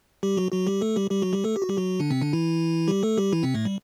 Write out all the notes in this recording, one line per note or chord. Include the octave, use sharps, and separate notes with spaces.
G3 G4
F#3 F#4
F#3 F#4
G3 G4
A3 A4
G3 G4
G3 G4
F#3 F#4
G3 G4
A3 A4
G4
F#4
G3 G4
F#3 F#4
D3 D4
C3 C4
D3 D4
E3 E4
G3 G4
A3 A4
G3 G4
E3 E4
C3 C4
A2 A3
G3